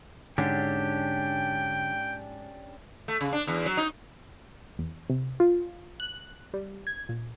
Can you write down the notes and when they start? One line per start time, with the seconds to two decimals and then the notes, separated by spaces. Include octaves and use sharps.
0.38 G#2 D3 C#4 D4 G4 G5
3.08 A3
3.21 C#3
3.33 D4
3.47 E2
3.66 F#3
3.77 D#4
4.79 E2
5.10 C3
5.40 F4
6.00 F#6
6.54 G3
6.87 G#6
7.09 A#2